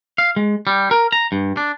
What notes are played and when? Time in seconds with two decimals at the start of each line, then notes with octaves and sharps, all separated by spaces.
0.18 F5
0.36 G#3
0.67 G3
0.91 A#4
1.12 A#5
1.32 G2
1.57 D4